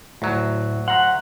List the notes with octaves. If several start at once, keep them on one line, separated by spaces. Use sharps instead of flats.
D2 A2 F#3
F#5 A#5 C6